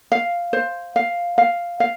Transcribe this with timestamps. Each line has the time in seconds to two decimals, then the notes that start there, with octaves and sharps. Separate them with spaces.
0.12 F5
0.53 C5
0.96 F5
1.38 F5
1.80 F5